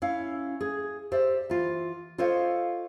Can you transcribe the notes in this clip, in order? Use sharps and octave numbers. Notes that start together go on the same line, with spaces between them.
C#4 E4 F5
G#4
G4 C5 D5 E5
E3 F4
F4 A4 C5 C#5 D#5 F5